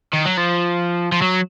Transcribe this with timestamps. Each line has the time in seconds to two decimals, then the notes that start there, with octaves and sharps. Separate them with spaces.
0.13 D#3
0.25 F#3
0.37 F3
1.12 F3
1.22 F#3